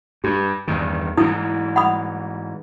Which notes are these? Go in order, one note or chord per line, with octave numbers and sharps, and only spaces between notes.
G2 G4
E2 G2 D#3
G#2 E3 E4 D#6
F#5 B5 D#6